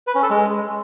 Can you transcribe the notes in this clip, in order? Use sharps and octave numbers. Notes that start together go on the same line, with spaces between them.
B4
C#4
A4
G#3